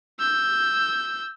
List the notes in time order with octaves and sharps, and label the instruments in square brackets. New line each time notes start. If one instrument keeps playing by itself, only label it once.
[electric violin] E6 G6